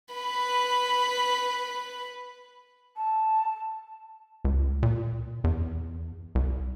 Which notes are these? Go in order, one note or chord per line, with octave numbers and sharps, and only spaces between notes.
B4 B5
A5
C#2
A#2
E2
C2